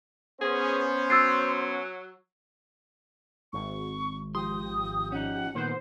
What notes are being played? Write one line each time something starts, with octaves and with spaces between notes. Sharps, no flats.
B3 C#4 G#4 C5
F#3 E6 A6 C7
G#1 C#6
F3 G4 C6 D#6
C#4 D#4 F#5
A#2 D#3 B3 C5